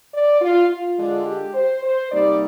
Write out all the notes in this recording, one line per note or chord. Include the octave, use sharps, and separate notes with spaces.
D5
F4
F4
D3 G#3 D4
G4
C5
C5
C3 G3 A#3 D#4 D5